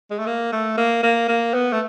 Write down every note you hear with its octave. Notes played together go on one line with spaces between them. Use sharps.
G#3
A3
A#3
A3
A#3
A#3
A#3
B3
A3